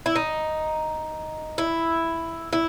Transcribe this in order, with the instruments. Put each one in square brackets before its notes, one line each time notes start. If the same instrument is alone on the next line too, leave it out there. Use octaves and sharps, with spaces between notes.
[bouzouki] E4
D#4
E4
E4